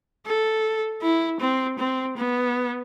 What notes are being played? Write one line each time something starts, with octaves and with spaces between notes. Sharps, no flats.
A4
E4
C4
C4
B3